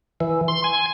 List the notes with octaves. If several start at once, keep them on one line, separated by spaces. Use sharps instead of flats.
E3
C6
G#5